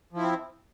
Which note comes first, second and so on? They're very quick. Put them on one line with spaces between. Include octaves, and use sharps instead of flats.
F3 E4 C4